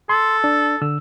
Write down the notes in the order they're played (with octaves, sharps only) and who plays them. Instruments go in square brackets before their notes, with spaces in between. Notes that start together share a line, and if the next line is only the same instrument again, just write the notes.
[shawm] A4 [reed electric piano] C6
[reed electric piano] D4
D3 E6